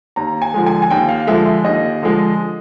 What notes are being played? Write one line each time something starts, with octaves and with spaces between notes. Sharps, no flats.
D#2 A#5
G#5
D3 F3 G#3
G#5
G#5
D#2 G5
F5
D3 F3 G#3 E5
D#2 D#5
D3 F3 G#3